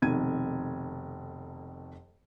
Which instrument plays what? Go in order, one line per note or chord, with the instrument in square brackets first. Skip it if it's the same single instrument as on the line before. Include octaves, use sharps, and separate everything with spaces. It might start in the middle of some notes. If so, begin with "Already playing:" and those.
[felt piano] F1 F2 B2 D#3 G#6 D#7